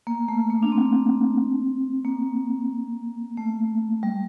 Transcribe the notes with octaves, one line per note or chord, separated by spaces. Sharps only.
A#3
A3
A#3
D4
C4
A#3
A3
G3